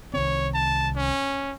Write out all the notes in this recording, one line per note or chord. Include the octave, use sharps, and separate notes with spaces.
C2 D#3 C4 C#5
A5
C#4